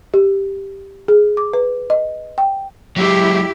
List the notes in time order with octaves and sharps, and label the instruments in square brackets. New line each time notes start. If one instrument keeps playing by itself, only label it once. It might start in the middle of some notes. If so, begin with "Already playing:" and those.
[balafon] G4
G#4
D6
B4
D#5
G5
[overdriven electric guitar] F#3 G#3 [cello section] E4 G4